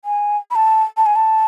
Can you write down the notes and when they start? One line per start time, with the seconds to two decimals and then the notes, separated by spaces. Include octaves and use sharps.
0.05 G#5
0.51 B5
0.55 A5
0.97 A5
1.06 G#5
1.16 A5